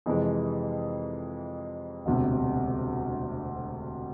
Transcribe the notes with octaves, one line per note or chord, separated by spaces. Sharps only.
F2 C3 E3 G#3
E1 D2 C3